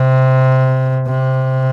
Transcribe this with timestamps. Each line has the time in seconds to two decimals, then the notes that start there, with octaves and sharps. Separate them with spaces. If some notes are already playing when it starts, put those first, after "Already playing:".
Already playing: C3
1.07 C3